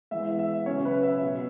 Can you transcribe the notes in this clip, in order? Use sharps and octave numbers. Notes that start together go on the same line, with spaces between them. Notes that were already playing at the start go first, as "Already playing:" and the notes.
E3 G#3 B3 E5
E5
C#3 F#3 C#4 C#5
B4
E5
B2 B3